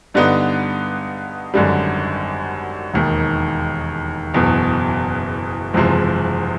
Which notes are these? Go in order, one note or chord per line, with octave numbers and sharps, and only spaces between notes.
G2 D3 G3 B3 D#4
G#1 F#2 D3 G3
E1 D#2 D#3
F#1 E2 B2
F#1 E2 C3 F3 G#3